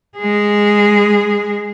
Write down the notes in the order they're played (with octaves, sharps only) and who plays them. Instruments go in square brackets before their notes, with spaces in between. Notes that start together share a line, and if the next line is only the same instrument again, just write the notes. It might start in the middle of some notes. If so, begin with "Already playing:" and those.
[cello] G#3 G#4